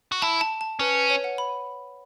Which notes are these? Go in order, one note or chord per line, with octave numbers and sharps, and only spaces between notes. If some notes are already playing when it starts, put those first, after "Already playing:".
F#4
E4 A5
A5
A5
C#4 B4
B4
C#5
F#5
B5